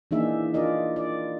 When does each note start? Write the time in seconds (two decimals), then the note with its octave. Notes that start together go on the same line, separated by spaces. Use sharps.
0.11 E3 A#3 D4 D#4 G#4 E5
0.54 D4 F4 A#4 D5 D#5
0.96 D5